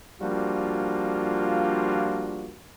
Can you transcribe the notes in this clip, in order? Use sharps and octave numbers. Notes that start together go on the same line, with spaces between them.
F3 G3 A#3 D4 F4 F#4